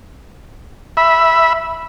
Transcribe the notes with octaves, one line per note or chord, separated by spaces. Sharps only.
E5 B5